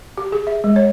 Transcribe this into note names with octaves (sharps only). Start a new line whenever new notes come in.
G4
G#4
E5
G#3
C#5